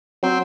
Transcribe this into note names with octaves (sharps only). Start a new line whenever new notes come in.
F#3 C4